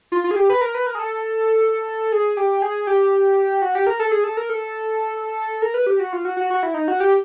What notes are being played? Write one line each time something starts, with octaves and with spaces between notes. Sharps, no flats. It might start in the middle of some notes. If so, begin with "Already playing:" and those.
F4
F4
G#4
G4
B4
A#4
B4
A#4
G#4
A4
G#4
G4
G#4
G4
F#4
G4
A#4
A4
G#4
A4
A#4
A4
A#4
B4
G4
F#4
F4
F#4
F#4
F#4
E4
D#4
F#4
G4